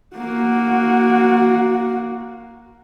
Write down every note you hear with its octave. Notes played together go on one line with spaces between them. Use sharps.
A#3 F#4